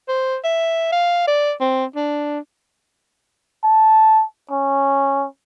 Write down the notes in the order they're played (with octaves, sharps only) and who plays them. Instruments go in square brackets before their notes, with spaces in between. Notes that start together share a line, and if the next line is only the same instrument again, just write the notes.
[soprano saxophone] C5
E5
F5
D5
C4
D4
[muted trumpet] A5
C#4